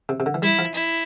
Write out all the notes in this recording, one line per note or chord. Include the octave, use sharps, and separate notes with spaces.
C3
C3
D3
E3
G3 E4
F3
E4